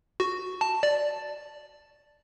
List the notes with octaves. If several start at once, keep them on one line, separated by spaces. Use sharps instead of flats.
F#4
A5
D5